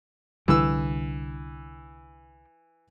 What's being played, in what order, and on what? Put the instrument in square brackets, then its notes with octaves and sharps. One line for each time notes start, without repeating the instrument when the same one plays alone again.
[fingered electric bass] C2 D3 G3 [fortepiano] E3 E6